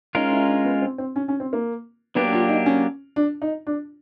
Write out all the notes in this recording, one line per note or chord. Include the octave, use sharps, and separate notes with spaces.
G#3 C#4 D#4 F4 A#4
E4
D4
B3
C4
C4
C#4
C#4
C4
A#3
F#3 A#3 B3 D4 G4
F4
D#4
C#4
D4
D#4
D4